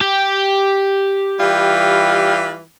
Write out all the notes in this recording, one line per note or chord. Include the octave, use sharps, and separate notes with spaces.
G4
E3 G3 F4